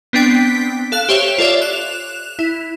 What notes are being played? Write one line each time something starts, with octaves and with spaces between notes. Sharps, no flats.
B3 C4 D4 G5 B6
A4 F5 F#6
G4 C5 C#5 E5 E7 F7
F4 A4 C#5 D5 E5
F#6 E7 F7
E4